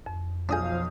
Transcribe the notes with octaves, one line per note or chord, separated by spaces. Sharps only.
F2
B1 F3 D4 G#4 F5 D#6 G6